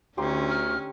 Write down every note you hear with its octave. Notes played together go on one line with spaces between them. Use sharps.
D2 D3 C#4 D#4 G4 C6
F6